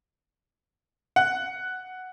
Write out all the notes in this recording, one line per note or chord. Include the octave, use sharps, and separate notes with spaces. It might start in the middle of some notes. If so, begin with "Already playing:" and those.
F#5